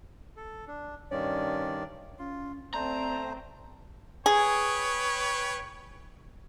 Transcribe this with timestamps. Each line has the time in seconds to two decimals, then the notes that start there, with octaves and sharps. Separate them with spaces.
0.36 A4
0.67 D4
1.11 G2 D#3 C#4 D5
2.19 C#4 F4
2.74 A3 C4 C5 D5 A#5
4.26 G#4 B4 C#5 G5